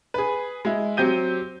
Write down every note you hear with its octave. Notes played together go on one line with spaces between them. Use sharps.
G#4 B4
G#3 E4
F#3 C4 G4 G6 D#7